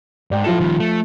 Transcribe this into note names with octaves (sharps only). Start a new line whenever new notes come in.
G#2 D5 G5
F3 E4 F4 A4 E7
D#3 G3
A3